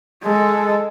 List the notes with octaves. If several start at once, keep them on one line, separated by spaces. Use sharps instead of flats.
G#3 A4